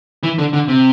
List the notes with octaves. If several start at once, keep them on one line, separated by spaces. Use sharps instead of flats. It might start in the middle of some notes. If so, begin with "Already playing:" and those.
E3
D3
D3
C3